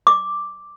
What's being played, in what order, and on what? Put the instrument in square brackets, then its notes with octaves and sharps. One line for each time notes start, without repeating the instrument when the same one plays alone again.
[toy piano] D6